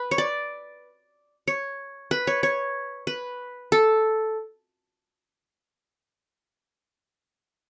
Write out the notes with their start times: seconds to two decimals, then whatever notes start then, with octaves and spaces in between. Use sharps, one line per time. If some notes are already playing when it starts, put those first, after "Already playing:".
Already playing: B4
0.11 C#5
0.18 D5
1.48 C#5
2.11 B4
2.27 C#5
2.43 C#5
3.07 B4
3.72 A4